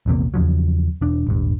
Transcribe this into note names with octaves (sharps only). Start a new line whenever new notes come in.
A#1 E2 C3 A#3
E2 C#3 F3 F#3
E1 D4
D#1 G#1 G2